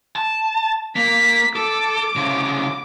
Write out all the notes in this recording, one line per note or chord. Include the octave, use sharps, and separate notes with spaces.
A5
A#3 B6
A4 D6
C2 C#3